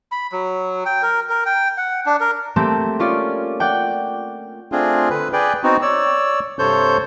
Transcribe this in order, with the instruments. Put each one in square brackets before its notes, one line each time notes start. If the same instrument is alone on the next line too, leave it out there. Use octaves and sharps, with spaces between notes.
[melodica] B5
F#3
G5
A#4
A#4
G5
F#5
D4
A#4
[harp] A3 A#3 C4 G4
C#4 F4 C#5 D5
D5 F#5 G5
[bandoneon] A3 C4 D4 F4 G#4
D3 B4
G#4 B4 D5 G5
B3 C4 D#4 F#4
C#5 D5 E6
G2 C3 A4 C5 C#5 G6